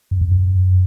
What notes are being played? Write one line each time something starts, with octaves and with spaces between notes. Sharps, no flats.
F#2
F2
F#2